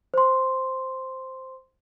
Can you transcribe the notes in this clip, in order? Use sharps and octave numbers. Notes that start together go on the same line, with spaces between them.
C5 C6